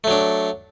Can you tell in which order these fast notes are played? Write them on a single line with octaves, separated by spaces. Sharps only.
A3 F#3 D4